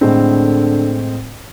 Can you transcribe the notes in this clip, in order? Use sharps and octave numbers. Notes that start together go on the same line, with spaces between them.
A2 D3 G#3 C4